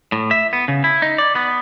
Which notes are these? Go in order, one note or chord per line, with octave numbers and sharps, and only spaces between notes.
A2
E5
B3
C#3
E4
D#4
D5
B3